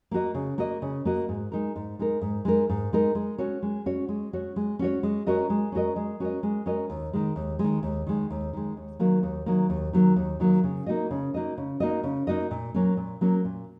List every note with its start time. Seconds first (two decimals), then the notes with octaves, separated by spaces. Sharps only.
0.11 A#3 F#4 D#5
0.34 C#3
0.58 A#3 F#4 D#5
0.82 C#3
1.05 A#3 F#4 D#5
1.29 G#2
1.52 G#3 D#4 A#4
1.76 G#2
1.99 G#3 D#4 A#4
2.22 G#2
2.45 G#3 D#4 A#4
2.69 G#2
2.93 G#3 D#4 A#4
3.15 G#3
3.38 C#4 F#4 C#5
3.62 G#3
3.86 C#4 F#4 C#5
4.09 G#3
4.33 C#4 F#4 C#5
4.56 G#3
4.79 C#4 F#4 C#5
5.03 G#3
5.27 C#4 F#4 A#4 D#5
5.50 G#3
5.72 C#4 F#4 A#4 D#5
5.96 G#3
6.20 C#4 F#4 A#4 D#5
6.43 G#3
6.66 C#4 F#4 A#4 D#5
6.90 D#2
7.13 D#3 G#3
7.36 D#2
7.59 D#3 G#3
7.83 D#2
8.07 D#3 G#3
8.30 D#2
8.53 D#3 G#3
8.77 D#2
8.99 D#3 F#3 A#3
9.23 D#2
9.46 D#3 F#3 A#3
9.70 D#2
9.93 D#3 F#3 A#3
10.16 D#2
10.40 D#3 F#3 A#3
10.64 C#3
10.86 A#3 D#4 F#4 D#5
11.11 C#3
11.34 A#3 D#4 F#4 D#5
11.58 C#3
11.80 A#3 D#4 F#4 D#5
12.03 C#3
12.27 A#3 D#4 F#4 D#5
12.51 A#2
12.74 F#3 A#3 C#4
12.97 A#2
13.21 F#3 A#3 C#4
13.45 A#2